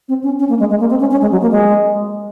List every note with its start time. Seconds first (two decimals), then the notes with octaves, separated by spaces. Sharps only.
0.09 C4
0.24 C#4
0.39 C#4
0.49 A#3
0.60 G#3
0.70 G#3
0.80 A#3
0.90 C4
1.00 C#4
1.11 C#4
1.21 G#3
1.31 F#3
1.42 A#3
1.52 G#3